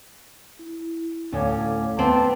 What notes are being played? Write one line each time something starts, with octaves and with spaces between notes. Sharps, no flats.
E4
D2 A2 A3 C#4 F5 D6
B3 C4 A5